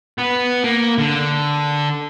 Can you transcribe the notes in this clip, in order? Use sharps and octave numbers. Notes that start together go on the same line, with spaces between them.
B3
A#3
D3